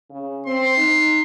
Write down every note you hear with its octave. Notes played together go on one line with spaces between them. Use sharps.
C#3
C4 C6
D#4